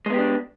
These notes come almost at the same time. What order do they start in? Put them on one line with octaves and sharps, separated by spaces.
G#3 B3 G4 D4